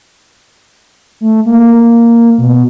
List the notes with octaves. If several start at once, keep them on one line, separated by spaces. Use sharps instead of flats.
A3
A#3
B2